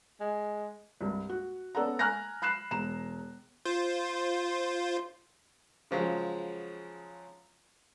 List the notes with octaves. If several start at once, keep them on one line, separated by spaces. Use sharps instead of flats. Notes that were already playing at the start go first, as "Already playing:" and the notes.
G#3
C2 G2
F#4
B3 C#4 A4 D5 F#5 A#5
G#5 A#5 F6 F#6 A#6
B5 F#6 C7 E7
E1 A#5 E7
F4 C5
C#3 F3 F#3 G#3